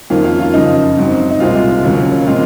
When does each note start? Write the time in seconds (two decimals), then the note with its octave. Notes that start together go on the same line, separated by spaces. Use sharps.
0.10 F2 D#3 A#3 C#4 F4
0.24 F4
0.40 F4
0.54 F#2 C#3 F3 D#4
0.97 G#2 F#3 C4
1.30 D#4
1.40 C2 A#2 G#3 C4 F4
1.84 D#2 C#3 F#3 A#3 C#4
2.26 A#2 G#3 C4 F4